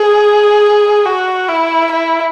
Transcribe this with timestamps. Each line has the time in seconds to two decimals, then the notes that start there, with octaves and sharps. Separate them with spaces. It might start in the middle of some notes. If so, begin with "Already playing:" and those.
Already playing: G#4
1.05 F#4
1.49 E4
1.92 E4